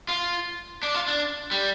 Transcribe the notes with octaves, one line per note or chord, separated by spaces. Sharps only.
F4
D4
F4
D4
G3